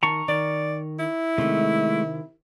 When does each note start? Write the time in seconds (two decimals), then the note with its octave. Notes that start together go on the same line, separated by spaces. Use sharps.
0.03 D#3 A5 A#5 C#6
0.28 D#3 D5
0.99 E4
1.38 C3 D#3 G#3 A3